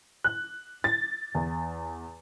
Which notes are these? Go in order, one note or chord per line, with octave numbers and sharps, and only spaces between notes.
F#6
A6
E2